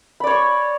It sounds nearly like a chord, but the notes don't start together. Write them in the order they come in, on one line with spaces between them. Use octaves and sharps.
B5 D5 C#5 C#6